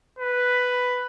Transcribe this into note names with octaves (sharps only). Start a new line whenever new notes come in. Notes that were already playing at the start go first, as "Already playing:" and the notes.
B4